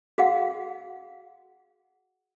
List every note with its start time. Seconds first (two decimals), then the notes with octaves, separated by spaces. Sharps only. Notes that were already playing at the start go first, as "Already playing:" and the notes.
0.18 F#4 G#4 F5 F#5